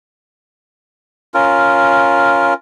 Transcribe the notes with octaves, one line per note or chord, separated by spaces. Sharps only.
C#4 F4 A#4